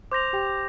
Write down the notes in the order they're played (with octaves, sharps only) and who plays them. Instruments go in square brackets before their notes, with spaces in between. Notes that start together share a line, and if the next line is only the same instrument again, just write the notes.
[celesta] C5 C6 [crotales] D6 G6 A#6 F7
[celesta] G4 G5